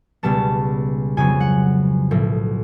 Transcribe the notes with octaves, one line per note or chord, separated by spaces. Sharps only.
C#2 B2 G3 B3 A5
F2 C#3 F#3 B3 G#5
F#5
B1 A2 F3